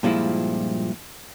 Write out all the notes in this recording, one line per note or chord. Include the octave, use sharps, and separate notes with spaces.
G2 A#2 F3 G#3 E4